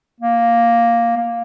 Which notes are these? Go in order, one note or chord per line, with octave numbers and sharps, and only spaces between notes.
A#3
A#3